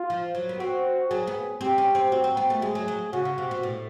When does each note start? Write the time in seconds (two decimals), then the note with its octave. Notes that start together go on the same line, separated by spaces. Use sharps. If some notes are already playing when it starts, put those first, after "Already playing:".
Already playing: F4
0.10 F3
0.35 F#3
0.49 B3
0.60 C4 F#4
1.11 F#3 G#4
1.27 B3
1.61 C4 G4
1.78 C#4
1.95 C4
2.11 C4 F#4
2.24 C4
2.37 B3
2.50 A3
2.62 G#3 G#4
2.75 F#3
2.88 F#3
3.13 C#3 F#4
3.25 C#3
3.38 C3
3.51 B2
3.63 A2